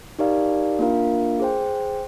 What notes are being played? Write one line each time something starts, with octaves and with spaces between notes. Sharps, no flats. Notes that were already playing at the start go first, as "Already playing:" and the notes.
D#4 G4 A#4 D5 F5
A#3 D4 F4 A#4 F5
G#4 C5 G5